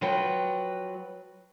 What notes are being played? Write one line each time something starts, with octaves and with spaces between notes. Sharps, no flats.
F3 F#3 B4 G5